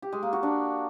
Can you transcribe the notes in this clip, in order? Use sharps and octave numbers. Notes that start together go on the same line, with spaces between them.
G4
G#3
A#3
F#4
D4